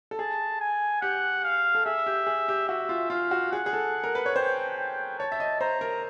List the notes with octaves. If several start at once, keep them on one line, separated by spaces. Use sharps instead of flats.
A4
G#4 A5
G#5
G4 F#5
F5
A4
G#4 E5
G4
G#4
G4
F#4 E5
F4
F4 F5
F#4
G#4 F#5
G#4
A4
A#4
B4
C#5
C5 G5
G5
C#5 A5
E5
D#5
C5 A#5
A#4